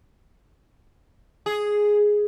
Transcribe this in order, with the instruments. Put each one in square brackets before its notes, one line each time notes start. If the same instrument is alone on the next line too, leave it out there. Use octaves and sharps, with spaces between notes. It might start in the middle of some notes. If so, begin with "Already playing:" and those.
[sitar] G#4